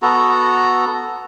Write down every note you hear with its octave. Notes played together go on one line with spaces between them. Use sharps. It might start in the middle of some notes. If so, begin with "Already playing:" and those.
B3 F#4 A4 A#5